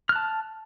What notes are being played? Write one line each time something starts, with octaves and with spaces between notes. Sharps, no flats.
A5 F6 F#6